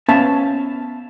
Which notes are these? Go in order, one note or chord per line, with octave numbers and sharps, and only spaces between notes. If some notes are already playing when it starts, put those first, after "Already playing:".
B3 C#4 C5 E5 F5 A5